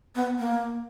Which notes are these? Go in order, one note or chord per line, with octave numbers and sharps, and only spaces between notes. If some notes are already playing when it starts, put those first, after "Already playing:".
B3
A#3